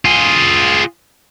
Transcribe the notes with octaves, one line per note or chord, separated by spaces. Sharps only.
F4 G#4